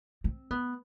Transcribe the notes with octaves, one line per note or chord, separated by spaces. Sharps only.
C4
B3